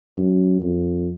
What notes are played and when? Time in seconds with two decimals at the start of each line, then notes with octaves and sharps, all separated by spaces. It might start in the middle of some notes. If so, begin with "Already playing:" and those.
0.17 F#2
0.61 F2